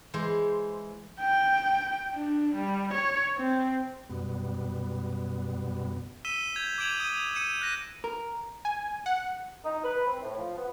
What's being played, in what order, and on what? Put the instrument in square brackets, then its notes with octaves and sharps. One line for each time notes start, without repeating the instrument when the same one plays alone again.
[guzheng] E3 G#3 C5
[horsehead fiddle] G5
D4
G3
C#5
C4
[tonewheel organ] F#2 B2 G3 B3
[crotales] E6 B6 D#7 E7 G7
G6 G#6 F7
D6 G6 G#6 D7 E7 F#7
D#6 D#7
E6 C#7 D#7 E7
F#6 A#6 D#7
[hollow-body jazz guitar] A#4
[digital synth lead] G#5
F#5
[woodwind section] D#4
B4
C4
A2
F3
B3